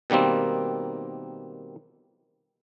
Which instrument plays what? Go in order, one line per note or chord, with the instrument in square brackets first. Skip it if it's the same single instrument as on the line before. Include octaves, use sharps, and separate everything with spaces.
[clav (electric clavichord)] B2 D#3 G3 A#3 C4